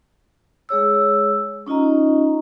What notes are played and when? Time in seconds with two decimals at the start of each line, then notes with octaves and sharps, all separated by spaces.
0.69 G#3 G#4 C#5 E6
1.67 C#4 D#4 F4 D#5 A#5